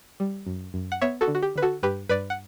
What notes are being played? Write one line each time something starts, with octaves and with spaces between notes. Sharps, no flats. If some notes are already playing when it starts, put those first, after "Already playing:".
G3
F#2
F#2
F#5
B3 C#5 E5
F#4 A4
D3
F#4
G4
D3 B4
F#4 A4
G2 G4 B4
G2 B4 D5
F#5